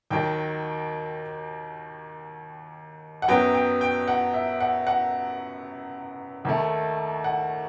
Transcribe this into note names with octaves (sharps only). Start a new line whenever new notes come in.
D#2 D#3 F#3 G5
F#5
F#2 F#3 B3 G5
G5
G5
F#5
E5
F#5
F#5
D#2 D#3 A3
F#5